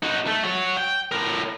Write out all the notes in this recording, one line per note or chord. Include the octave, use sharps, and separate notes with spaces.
D#4 F#4
A3
F#4 C#5
G5
A2 A#4